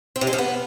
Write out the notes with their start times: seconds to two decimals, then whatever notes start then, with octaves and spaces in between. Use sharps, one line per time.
0.16 C4
0.21 C3
0.27 G#3
0.33 F3
0.38 B3